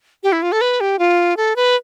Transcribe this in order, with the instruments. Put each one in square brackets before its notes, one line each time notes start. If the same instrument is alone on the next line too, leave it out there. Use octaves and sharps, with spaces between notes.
[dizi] G4
E4
F4
A4
B4
G4
F4
A4
B4